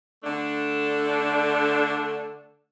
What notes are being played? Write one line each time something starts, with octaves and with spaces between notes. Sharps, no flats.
D3 A3 D4